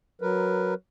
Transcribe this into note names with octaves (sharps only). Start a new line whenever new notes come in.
F#3 A#4 B4